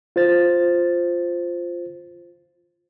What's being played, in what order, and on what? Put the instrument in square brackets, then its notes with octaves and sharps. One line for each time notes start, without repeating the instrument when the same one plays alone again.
[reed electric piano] F4 C5 A6